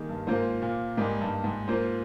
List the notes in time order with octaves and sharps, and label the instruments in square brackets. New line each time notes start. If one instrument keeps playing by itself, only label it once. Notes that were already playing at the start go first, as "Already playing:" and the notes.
Already playing: [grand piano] D#3 G3 A#3 D#4 G#4
[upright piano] G2
[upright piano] G#2 [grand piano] A#3 F4 C5
[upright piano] A#2
[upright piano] G#2 [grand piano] G3 A#3 D#4 G4
[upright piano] G2
G#2
[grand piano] A#3 F4 C5